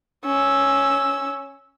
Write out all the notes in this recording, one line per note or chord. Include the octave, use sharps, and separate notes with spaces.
C#4 E6